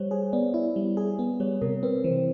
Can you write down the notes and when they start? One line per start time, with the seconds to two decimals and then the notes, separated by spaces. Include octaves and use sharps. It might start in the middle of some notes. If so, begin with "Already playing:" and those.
Already playing: G3 C5 C#5
0.11 G#4 C#5
0.32 B3 D5
0.54 E4
0.76 G3
0.97 G#4
1.19 B3
1.40 G3 C#5
1.61 C3 A#4
1.83 C4 B4
2.04 E3 C5